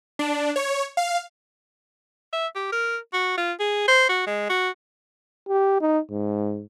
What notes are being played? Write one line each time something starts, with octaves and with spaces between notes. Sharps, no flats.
D4
C#5
F5
E5
G4
A#4
F#4
F4
G#4
C5
F#4
G#3
F#4
G4
D#4
G#2